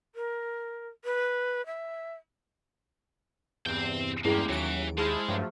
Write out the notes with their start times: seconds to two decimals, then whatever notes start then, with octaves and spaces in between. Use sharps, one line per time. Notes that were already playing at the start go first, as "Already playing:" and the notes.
0.15 A#4
1.05 B4
1.66 E5
3.66 E2 G2 C3 C4 G5
4.25 E2 G2 G#3 A#3 C#4 E4 G4 G#4
4.49 D#2 E3 F#3 D7
4.98 G#3 E4 G#4 C5 A5 F6
5.28 G2 F3 F#3 A3